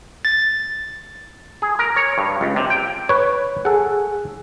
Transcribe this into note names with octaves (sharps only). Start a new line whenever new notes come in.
A6
G#4
A#4
C#5
G2
C#2
C3
G5
B4 C#5
G#4 A4 F#5